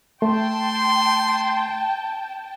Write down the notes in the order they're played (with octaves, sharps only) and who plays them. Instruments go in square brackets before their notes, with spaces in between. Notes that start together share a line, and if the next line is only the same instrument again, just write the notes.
[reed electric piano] A3 [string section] G5 A5 [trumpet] C6